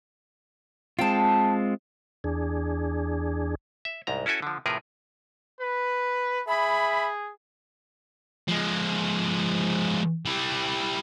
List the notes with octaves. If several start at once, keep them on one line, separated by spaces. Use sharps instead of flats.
G#3 C4 F4 G5 A5
E2 D4 G#4
E5
C2 G#2 A#5
C#4 E4 F#4 A4 G#5
D3 F3
A2 C3 F3 G#4 A#4 B4
B4
G#4 E5 B5
F3 G#3
G3 E4